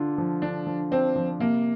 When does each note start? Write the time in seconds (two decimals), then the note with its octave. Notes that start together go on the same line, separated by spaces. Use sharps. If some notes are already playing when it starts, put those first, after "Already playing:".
Already playing: D3 D4 F4
0.18 F3
0.42 D3 D4
0.67 F3
0.91 C4 D4
1.16 F3
1.39 C3 A#3